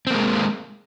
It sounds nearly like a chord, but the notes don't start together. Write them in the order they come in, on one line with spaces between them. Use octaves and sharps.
C4 A#3 G#3